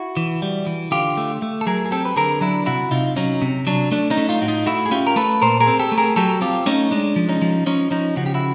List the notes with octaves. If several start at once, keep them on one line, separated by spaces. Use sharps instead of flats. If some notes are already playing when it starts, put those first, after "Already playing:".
Already playing: E4 F#4
E3
G3
E3
D3 F4 G4
A3
A3
A4
F#3 G#4 A#4
G#4
C4 G4 A4
B4
D3 G#4 A#4
F#3 D4 E4
C3 E4 F#4
C3 D#4 F4
F#3 C#4 D#4
C3
F#3 D4
A3 D4
C#4 D#4
A3
D#4 F4
A2 F#4
D#4 F4
A3 E4 F#4
G#4
C#4 F4 G4
A#4
A3 A4 B4
A#2 A#4 C5
G#4 A#4
C4
G4 A4
A3
G#4 A#4
F#3 G4 A4
C4 F4 G4
A3 C#4 D#4
G#3 D4
F3
C#4 D#4
F3
F3 C#4 D#4
F3 C#4 D#4
C#3 F#4
G4
E4 F#4